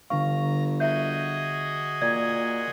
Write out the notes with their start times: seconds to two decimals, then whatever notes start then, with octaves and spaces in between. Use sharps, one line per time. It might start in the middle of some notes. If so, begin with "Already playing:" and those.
0.10 G1 D3 F5 A#5 C#6
0.80 F#4 G#4 D#5 E5 G6
2.02 A#2 D5 G#6